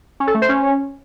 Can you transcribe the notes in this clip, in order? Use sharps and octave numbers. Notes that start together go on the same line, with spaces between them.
C#4
A4
A3
C5
C#4